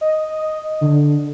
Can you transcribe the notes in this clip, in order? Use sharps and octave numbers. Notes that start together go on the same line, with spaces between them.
D#5
D3